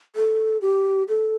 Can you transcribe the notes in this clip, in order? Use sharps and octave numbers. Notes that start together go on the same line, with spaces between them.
A4
G4
A4